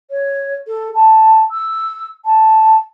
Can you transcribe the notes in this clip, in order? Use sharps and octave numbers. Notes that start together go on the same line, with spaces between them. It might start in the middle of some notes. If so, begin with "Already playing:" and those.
C#5
A4
A5
E6
A5